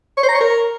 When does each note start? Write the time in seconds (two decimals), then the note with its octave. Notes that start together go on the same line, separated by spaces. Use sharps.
0.17 C#5
0.23 C5
0.29 A#5
0.35 C#5
0.40 A#4